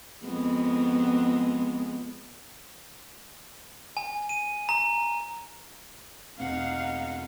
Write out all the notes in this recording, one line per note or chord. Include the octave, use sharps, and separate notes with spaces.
F2 G#3 B3
G#5
D#7
A#5
E2 B2 C4 D#4 F5 F#5